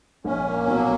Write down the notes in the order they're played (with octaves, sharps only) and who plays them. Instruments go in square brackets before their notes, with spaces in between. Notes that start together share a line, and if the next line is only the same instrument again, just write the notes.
[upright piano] A#1 A#2 [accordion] C#4
[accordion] A#3
[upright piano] B1 B2 [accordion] F#3